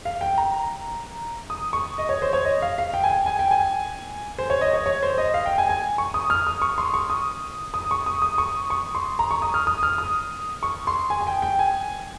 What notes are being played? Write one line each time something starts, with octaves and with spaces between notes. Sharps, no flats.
F5
G5
A#5
D#6
C#6
D#5
C#5
C5
C#5
D#5
F5
F5
G5
G#5
G5
G#5
G5
G#5
C5
C#5
D#5
C#5
C#5
C5
D#5
F5
G5
G#5
G#5
C#6
D#6
F6
D#6
C#6
C6
C#6
D#6
D#6
C#6
D#6
D#6
C#6
C#6
C6
A#5
C#6
D#6
F6
D#6
F6
D#6
C#6
C6
G#5
G#5
G5
G5
G#5